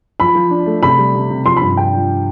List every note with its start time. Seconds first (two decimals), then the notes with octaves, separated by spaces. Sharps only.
0.20 F3 B5
0.35 F3
0.50 D4
0.66 A3
0.82 C3 B5
0.98 G3
1.15 C3
1.31 C3
1.46 F3 C6
1.57 B5
1.61 G2
1.77 D4 G5
1.94 F3